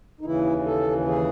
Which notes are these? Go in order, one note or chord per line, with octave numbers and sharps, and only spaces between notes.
D#4
D#2 C#3 E3 E4
A4
G#4